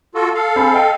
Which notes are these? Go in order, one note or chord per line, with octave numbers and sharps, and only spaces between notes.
F4 F#4 A4
A4 F5
C4 G#4 B5
D#5 G5